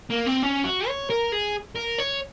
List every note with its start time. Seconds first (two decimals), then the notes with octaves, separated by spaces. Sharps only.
0.10 A#3
0.27 C4
0.43 C#4
0.65 F#4
0.88 C#5
1.10 A#4
1.32 G#4
1.75 A#4
1.99 C#5